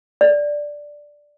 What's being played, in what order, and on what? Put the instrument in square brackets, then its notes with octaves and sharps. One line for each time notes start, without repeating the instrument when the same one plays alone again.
[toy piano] D5